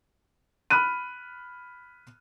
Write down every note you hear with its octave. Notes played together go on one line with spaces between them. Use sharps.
B5 F6 F#6 D#7